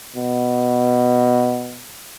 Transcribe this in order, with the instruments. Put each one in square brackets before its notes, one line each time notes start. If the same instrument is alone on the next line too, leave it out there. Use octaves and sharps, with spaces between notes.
[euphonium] B2